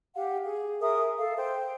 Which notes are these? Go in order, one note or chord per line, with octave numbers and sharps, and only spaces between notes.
G4 F5 F#5
G#4
G#4 A#4 E5 D#6
A4 F5
C5 G5